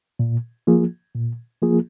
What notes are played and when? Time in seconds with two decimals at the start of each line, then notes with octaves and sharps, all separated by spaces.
0.19 A#2
0.67 F3 A#3 F4 G#4
1.15 A#2
1.62 F3 A#3 F4 G#4